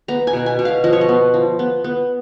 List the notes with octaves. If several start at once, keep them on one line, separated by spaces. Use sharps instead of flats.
B3 A#5
G#5
B2
G#5
B2
F5
F3 D#5
C#5
D#5
B3
F3
B3
B3